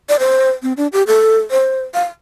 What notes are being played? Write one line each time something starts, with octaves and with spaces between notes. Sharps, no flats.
D5
C5
C4
D4
G4
A4
C5
F5